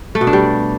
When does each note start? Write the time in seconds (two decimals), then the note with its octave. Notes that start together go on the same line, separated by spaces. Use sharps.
0.15 A3
0.21 B2
0.27 D4
0.33 G3